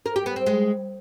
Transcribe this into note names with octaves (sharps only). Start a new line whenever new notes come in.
A#4
G4
B3
C4
G#3